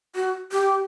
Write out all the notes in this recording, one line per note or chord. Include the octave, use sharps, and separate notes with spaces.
F#4
G4